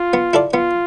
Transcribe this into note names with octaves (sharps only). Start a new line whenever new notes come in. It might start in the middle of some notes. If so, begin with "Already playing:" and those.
Already playing: F4
B3
E4 A4 D5
B3 F4